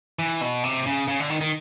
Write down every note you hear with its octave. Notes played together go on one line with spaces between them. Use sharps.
E3
B2
C3
C#3
C#3
D3
D#3
D#3